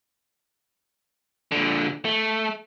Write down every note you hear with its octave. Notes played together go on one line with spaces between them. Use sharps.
A#2 D3
A3